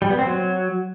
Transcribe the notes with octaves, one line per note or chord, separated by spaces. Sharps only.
G3
B3
C4
F#3